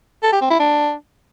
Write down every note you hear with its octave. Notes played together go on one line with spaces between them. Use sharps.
A4
G4
C4
E4
D4